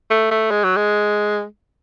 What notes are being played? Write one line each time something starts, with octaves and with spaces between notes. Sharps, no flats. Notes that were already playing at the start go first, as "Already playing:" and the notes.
A3
A3
G#3
F#3
G#3